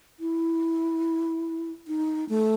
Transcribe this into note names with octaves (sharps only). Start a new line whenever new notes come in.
E4
D#4
A3